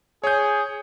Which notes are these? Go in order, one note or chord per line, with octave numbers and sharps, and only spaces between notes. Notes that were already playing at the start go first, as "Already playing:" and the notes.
G#4 C#5 G6